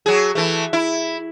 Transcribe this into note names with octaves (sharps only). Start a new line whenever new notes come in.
F#3 G#4
E3 A3
E4